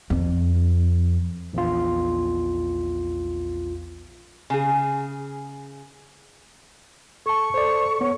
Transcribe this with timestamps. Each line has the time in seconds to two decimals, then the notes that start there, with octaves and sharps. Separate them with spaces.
0.10 F2
1.53 A#1 E2 F4
4.50 C#3 G#4
7.26 A4 A5 C#6
7.54 A4 C5 D5
8.01 B3 C#5